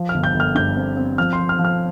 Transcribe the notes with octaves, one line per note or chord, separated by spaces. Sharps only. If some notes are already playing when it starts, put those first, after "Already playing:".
Already playing: F3
F6
G1
G6
G1
F6
G2 G6
C4
C4
F3 F6
C6
F3
F6
F3
F6